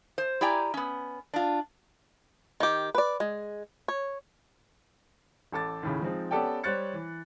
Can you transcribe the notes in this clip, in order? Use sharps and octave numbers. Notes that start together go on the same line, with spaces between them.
C5
E4 G4 D5 G5 G#5 A#5
B3 C#4
D4 F4
D#3 G4
B4 D5
G#3
C#5
A1 A4 D6 A6
D#2 A2 C#3
F3 G#3 C4 D#4
B3 C#4 G4 A4 D5 G5
G3 C5 C#5 F#6 A6 C#7
E3